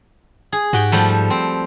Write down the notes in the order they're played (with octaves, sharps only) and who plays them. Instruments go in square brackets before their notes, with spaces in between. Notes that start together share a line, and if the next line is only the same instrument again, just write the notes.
[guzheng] G#4
[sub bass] G#2 [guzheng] F#4 G4 G5
[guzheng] F3 G3 A3
C4